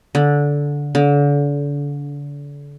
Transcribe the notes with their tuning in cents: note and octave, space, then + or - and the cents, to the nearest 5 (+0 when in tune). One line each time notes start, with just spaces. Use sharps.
D3 -15
D3 -35